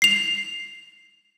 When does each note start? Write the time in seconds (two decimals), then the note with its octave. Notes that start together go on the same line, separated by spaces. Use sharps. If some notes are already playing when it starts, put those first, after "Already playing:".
0.02 C7 F7